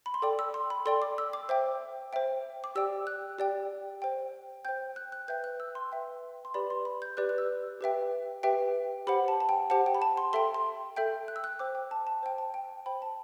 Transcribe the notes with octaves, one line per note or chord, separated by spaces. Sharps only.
B5
C6
A4 D5 G5 D6
E6
C6
B5
A4 D5 G5 C6
D6
E6
D6
C5 E5 G5
C5 E5 G5
D6
G4 D5 G5 E6
F#6
G4 D5 G5
C5 G5
C5 G5 G6
F#6
F#6
B4 E5 G5 G6
F#6
E6
C6
B4 E5 G5
C6
G4 B4 D5 B5
C6
B5
G6
G4 B4 D5 F#6
F#6
E6
G4 B4 E5 G5
G4 B4 E5 G5
G4 C5 F#5 B5
A5
A5
G5
G4 C5 F#5 A5
G5
B5
A5
C6
A4 E5 G5 C6
C6
A4 E5 G5 G6
F#6
E6
F#6
C5 G5 D6
G5
A5
A5
C5 G5
A5
G5
C5 G5 B5
A5